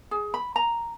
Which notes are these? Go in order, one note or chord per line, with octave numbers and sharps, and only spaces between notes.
G#4
B5
A#5